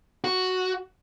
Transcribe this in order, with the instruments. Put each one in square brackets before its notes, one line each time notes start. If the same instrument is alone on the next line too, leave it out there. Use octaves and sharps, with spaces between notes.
[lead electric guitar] F#4